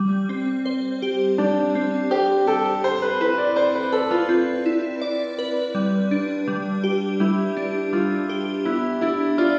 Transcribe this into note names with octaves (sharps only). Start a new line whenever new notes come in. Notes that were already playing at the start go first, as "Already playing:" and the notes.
Already playing: G3
C4
C5
G4
G3 D4
C4
G4 C5
G4 A4
C4 C5
B4
E4 B4
D5
C5 D5
B4
A4 B4
F4
C4 F4
E4
D5
B4
G3
D4
G3
G4
G3 E4
D4
G3 F4
G4
B3 E4
D4 E4
F4 D5